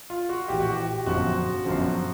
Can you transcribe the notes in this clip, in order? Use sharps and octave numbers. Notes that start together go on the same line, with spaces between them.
F4
F#4
A#1 A2 E3 G4
F#4
G4
G1 F#2 D3 F3 F#4
G1 F#2 D3 F3